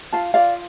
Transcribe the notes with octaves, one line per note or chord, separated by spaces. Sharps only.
F4 F5 A5
F4 D5 F5